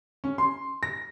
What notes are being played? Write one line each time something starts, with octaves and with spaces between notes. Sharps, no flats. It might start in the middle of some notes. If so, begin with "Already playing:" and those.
C#4
C6
A#6